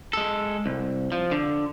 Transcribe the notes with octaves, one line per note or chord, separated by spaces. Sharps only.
G#3 A4
C2
F3
D3